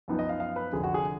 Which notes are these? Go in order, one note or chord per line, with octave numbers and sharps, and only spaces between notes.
F#2 F3 B3 D#4
D#5
F5
F5
B4
F1 F2 D3 G#4
F#4
G#4